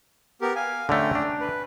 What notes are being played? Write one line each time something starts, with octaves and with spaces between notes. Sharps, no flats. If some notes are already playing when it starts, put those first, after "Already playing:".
B3 G4 A#4
F5 G#5
D3 A3 C#4 G5 A#5
D4
B4